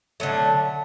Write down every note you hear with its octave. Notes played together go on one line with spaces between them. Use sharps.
D3 F#3 A3